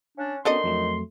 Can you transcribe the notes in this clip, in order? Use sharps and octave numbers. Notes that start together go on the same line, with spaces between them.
C#4 D4
D#3 B3 C#4 D4 F#4 A4 D#5 C6
F2 F#3 A3